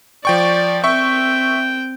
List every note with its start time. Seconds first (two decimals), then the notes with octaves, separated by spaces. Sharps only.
0.25 F3 D5 G5 C#6
0.84 C4 E5 G5 C#6